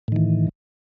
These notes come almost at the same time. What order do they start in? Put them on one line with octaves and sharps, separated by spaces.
A2 D#3 E3